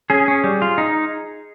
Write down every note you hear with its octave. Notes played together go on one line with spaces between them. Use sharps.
C#4 G#4
C#4
G3
F4
D#4